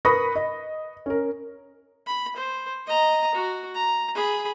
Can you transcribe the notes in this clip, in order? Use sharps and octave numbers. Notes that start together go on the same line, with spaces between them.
A#4 B4 B5 C#6 D#6 A#6
D#5
C#4 A#4
B5
C5
D#5 A#5
F#4
A#5
G#4 B5